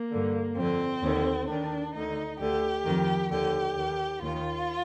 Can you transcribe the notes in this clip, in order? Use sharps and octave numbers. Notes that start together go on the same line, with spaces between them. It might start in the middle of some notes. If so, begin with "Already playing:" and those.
Already playing: A#3
G2 D3
F2 D3 C4
D#2 D3
D#2 D#3 D4
D2 D3 D#4
D2 D3 G4
F2 D#3
D#2 D3 G4
D#2 D#3
D#2 D#3 F4